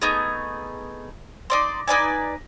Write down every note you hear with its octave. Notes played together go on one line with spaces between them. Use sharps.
A3 B3 D#4 G#4
D#4 D5 C6
D#4 B4 D5 G#5